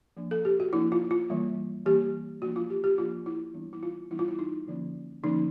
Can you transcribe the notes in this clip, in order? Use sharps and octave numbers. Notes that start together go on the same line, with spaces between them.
F3 A#3 D4
A4
G4
F#4
F3 A#3 D4 E4
F4
F4
E3 G3 A#3
E3 G3 A#3 G4
F3 A#3 D4 F#4
F4
G4
G4
F3 A#3 D4 F4
E4
E3 G3 B3 D4 E4
E4
F4
E3 G3 B3 D4 E4
F4
E4
D#4
D3 F3 A#3 C#4
D3 F3 A#3 C#4 D#4